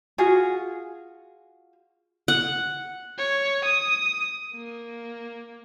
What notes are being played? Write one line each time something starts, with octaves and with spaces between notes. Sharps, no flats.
F4 F#4 G#4
F#5
C#5
D#6
A#3